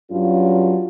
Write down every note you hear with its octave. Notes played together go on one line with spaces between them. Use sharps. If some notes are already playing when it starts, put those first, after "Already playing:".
G2 F#3 C#4 F4